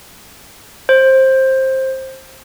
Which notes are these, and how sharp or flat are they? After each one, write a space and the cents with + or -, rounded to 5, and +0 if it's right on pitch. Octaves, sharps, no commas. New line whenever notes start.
C5 +15